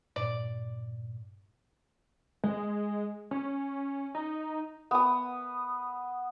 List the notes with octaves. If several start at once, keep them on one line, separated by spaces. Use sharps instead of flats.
G2 A#2 D5
G#3
C#4
D#4
B3 D#6